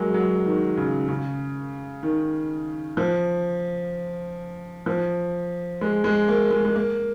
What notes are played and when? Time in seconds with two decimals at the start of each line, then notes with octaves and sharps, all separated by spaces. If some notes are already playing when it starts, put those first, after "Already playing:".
Already playing: F#3 G#3 A#3
0.14 F#3
0.46 D#3
0.77 C#3
1.09 C#3
2.03 D#3
2.97 F3
4.86 F3
5.81 G#3
6.04 G#3
6.28 A#3
6.51 G#3
6.65 G#3
6.76 A#3